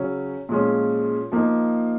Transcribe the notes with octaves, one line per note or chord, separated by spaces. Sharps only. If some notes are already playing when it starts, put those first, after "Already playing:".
Already playing: C#3 F#3 C#4
A#2 F3 G#3 C#4
F3 A#3 D#4